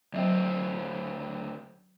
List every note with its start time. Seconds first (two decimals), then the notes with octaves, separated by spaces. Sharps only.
0.14 D2 F#3 C4 E5 G5